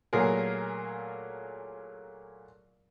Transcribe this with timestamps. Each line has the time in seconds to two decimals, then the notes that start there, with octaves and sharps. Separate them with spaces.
0.13 A#2 F#3 A3 F4 G#4 A#4